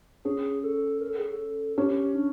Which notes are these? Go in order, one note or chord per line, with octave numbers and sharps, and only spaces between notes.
C#4 G#4
A4
A#4
A4
G#4
A4
C#4 G4
D4